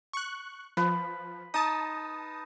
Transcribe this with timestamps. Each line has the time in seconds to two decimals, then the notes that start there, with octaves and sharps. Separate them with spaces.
0.13 C#6 F#6
0.77 F3 B4
1.54 D#4 A5 D#6